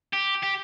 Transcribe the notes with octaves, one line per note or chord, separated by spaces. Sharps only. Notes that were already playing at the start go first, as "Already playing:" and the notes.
G4
G4